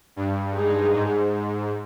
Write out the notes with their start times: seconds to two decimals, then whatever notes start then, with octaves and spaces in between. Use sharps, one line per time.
0.16 G2
0.54 G#3 D#4 G#4
0.92 G#2